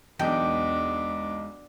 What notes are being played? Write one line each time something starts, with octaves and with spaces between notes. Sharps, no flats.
B1 E2 G#3 B3 D4 D#4 G5